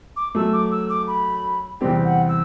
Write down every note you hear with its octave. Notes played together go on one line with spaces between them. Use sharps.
D6
F#2 F#3 A3 E6
D6
E6
D6
B5
E2 C3 G3 C4 G4 G5
F#5
E6